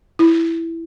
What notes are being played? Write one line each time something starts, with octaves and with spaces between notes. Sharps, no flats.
E4